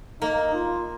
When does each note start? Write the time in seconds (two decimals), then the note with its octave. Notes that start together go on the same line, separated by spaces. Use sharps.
0.22 A#3 D#4
0.54 F4